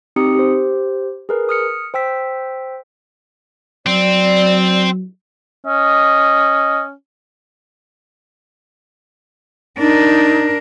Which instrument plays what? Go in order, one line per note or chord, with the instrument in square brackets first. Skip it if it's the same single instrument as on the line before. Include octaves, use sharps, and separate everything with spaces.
[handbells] C4 D#4 G4 D#6 C#7
G4 C5
G#4 A#4 B4
D#6 F6 C#7
C5 G5 E6 B6
[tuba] F#3 [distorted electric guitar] C4 [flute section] D5
[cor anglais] C#4 [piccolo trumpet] D#5
[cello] D4 A#4 [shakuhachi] D#4